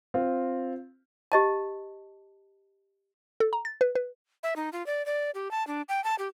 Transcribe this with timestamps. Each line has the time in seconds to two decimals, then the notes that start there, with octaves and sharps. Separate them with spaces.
0.14 C4 F4
1.32 G4 D#5 A5
3.40 A4
3.53 A#5
3.65 A6
3.81 B4
3.95 B4
4.43 E5
4.56 D#4
4.72 F4
4.86 D5
5.06 D5
5.35 G4
5.51 A5
5.67 D4
5.89 G5
6.04 A5
6.19 G4